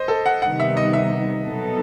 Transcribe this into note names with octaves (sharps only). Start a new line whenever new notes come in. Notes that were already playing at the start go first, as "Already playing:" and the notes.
Already playing: C5 D#5
A4
F#5
C3 D#3 G3 B3 D#4 F#5
E5
D#5
E5
B2 F#3 B3 D#4 A4